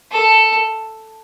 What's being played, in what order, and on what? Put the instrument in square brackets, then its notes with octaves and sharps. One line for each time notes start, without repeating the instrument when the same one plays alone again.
[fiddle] A4